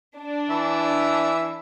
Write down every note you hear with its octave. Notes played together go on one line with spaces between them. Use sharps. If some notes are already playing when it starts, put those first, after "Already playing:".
D4
E3 E5